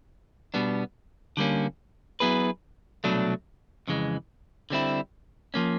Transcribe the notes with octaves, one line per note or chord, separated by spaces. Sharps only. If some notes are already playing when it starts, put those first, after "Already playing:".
B2 G3 B3 D4
D3 G3 A#3 C#4
F#3 B3 E4 G#4 B4
C2 B2 F#3 A3 D4
F2 C#3 E3 G#3
D3 G3 C4 E4
F3 A#3 C#4